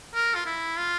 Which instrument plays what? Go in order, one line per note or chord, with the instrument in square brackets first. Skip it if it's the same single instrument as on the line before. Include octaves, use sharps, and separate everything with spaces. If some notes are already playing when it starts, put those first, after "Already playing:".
[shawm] A#4
F4
E4
F4